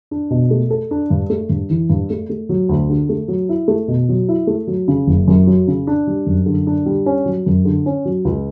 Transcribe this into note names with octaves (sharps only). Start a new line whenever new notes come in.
D4
B2
A3
A4
D4
G2
A3
G2
E3
G2
A3
A3
F#3
D2
D3
A3
F#3
E4
A3
B2
F#3
E4
A3
F#3
C#3
F#1
F#2
F#3
C#3
D4
G3
F#2
D3
D4
G3
C#4
F#3
F#2
D3
C#4
F#3
C#2